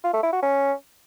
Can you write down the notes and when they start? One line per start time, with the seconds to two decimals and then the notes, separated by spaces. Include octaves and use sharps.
0.04 F4
0.14 A3
0.23 E4
0.33 F#4
0.42 C#4